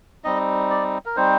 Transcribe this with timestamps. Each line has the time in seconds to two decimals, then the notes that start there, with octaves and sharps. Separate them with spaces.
0.24 G3 C4 D#4 D#5
0.70 D5
1.06 A#4
1.17 G3 C4 D#4 C5